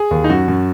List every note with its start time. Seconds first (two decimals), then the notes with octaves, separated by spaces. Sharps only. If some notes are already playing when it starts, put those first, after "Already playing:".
Already playing: G#4
0.11 D#2
0.24 D#4
0.30 F#2 F#4
0.48 F#2